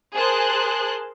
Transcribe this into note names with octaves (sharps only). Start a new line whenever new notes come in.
G#4 A#4 C5 A5 C6 F#6